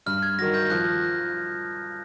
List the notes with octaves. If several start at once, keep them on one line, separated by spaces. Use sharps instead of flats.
G2 F6
G#6
D#3 F#3 A#6
G6
F3 F#6